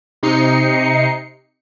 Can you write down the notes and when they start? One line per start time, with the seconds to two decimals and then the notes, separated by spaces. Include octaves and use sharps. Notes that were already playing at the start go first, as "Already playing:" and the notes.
0.23 C3 D#4 C7 C#7